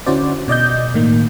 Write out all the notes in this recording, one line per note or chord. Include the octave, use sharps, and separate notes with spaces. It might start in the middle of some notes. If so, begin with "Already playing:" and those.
D3 C#4 E4 F#4 C5 D5
B2 D5 D#5 G6
A2 D#3 A#3